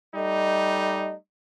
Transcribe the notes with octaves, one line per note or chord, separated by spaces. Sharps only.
G3 A3 D#4 D#5